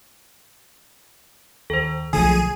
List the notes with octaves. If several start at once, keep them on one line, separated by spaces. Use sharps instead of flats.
D#2 A4 C5
B1 D3 F3 A3 G#4 G#5 D#7